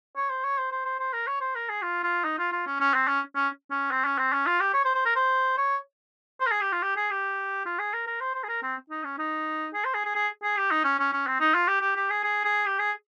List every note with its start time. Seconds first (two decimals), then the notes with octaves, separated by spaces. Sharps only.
0.17 C#5
0.30 C5
0.44 C#5
0.58 C5
0.72 C5
0.85 C5
0.99 C5
1.13 A#4
1.27 C#5
1.41 C5
1.55 A#4
1.69 G#4
1.82 F4
2.03 F4
2.24 D#4
2.38 F4
2.52 F4
2.67 C#4
2.80 C#4
2.94 C4
3.08 C#4
3.36 C#4
3.71 C#4
3.91 C4
4.05 C#4
4.19 C4
4.32 C#4
4.46 F4
4.60 G4
4.74 C#5
4.85 C5
4.95 C5
5.05 A#4
5.16 C5
5.58 C#5
6.40 C5
6.46 A#4
6.51 G#4
6.61 G4
6.72 F4
6.82 G4
6.97 G#4
7.11 G4
7.66 F4
7.79 G#4
7.94 A#4
8.07 A#4
8.21 C5
8.35 C5
8.44 G#4
8.49 A#4
8.63 C4
8.90 D#4
9.04 C#4
9.18 D#4
9.74 G#4
9.85 C5
9.94 G#4
10.05 G#4
10.15 G#4
10.43 G#4
10.57 G4
10.71 D#4
10.84 C#4
10.99 C#4
11.12 C#4
11.27 C4
11.40 D#4
11.54 F4
11.68 G4
11.81 G4
11.96 G4
12.10 G#4
12.24 G#4
12.45 G#4
12.66 G4
12.79 G#4